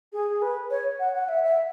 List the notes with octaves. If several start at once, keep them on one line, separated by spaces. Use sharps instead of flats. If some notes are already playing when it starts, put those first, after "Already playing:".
G#4
B4
C#5
F#5
F#5
E5
E5